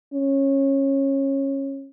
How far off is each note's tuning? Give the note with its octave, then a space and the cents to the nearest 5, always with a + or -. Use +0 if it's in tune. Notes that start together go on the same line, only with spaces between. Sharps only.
C#4 -20